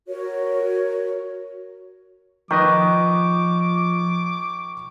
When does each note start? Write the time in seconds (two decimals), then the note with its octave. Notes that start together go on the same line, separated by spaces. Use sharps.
0.08 F#4 A#4 C#5
2.51 D#3 F3 B4 D#5 C#6 D6